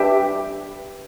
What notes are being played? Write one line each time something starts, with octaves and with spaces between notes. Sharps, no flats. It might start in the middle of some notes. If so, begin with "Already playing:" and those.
Already playing: D4 G4 B4 E5 G5